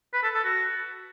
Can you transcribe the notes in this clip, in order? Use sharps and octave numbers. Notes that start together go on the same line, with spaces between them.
B4
A4
A4
F#4